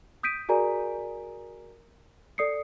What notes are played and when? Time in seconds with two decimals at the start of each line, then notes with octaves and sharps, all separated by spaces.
0.23 D#6 G6 B6 D7 D#7
0.49 F#4 G#4 A#4 D5 G#5 A#5
2.38 A4 D5 D#6 C7 C#7